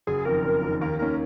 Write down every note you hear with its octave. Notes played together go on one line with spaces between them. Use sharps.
F#1 G#4
F2 D#3 A#4
F#1
F2 D#3
D#2 A#4
D#3 A#3 C#4 A#4